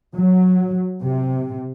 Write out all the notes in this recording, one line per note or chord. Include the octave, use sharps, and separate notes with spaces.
F#3
C3